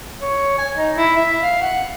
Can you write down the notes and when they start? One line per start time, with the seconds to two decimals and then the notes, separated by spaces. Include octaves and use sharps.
0.21 C#5
0.58 G#5
0.77 D#4
0.96 E4
1.17 E5
1.42 F5
1.62 F#5